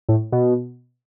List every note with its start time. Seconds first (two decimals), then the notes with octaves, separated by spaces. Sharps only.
0.09 A2
0.32 B2